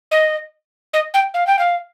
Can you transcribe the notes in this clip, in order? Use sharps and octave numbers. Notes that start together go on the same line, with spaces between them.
D#5
D#5
G5
F5
G5
F5